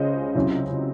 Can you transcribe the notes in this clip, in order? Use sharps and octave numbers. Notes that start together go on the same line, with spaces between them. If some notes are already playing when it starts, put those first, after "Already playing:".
Already playing: C#2 C#3 G#3 C#4 C5 D#5
C#2 C3 F#3 C#4 E4